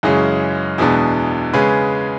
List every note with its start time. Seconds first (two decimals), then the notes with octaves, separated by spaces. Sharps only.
0.03 F#2 C#3 E3 G#3 C#4
0.78 E2 B2 G#3 B3 D4
1.54 C#3 G#3 C#4 G#4 B4